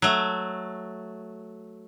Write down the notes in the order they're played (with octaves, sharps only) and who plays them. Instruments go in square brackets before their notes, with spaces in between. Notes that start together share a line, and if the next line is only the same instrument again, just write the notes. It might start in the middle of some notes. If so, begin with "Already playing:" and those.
[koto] F#3 A3